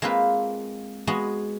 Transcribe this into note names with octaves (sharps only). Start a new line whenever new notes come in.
G#3 A#3 C4 F4 B4
G#3 B3 F#4 G#4